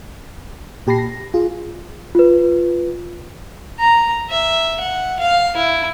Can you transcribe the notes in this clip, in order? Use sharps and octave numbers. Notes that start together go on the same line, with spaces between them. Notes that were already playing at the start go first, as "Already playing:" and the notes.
A#2 G4 A5 B5 A#6 C7
A#6
F4 G#4
F4 B4
A#5
E5
F#5
F5
E4